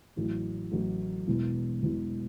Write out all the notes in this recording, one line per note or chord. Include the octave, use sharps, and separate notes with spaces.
A1 A2 F#3
A1 A2 F#3
E1 E2 B2
E1 E2 B2